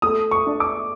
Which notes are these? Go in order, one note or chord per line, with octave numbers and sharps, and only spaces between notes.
A3 D#6
C#6
D4
D6